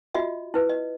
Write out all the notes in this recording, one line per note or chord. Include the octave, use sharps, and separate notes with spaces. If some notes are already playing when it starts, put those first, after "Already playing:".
F4 F#4 D#5 E5
E4 B4
D#5